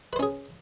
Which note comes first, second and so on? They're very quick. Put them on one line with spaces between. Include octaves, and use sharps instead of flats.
B4 C5 C#4 G#4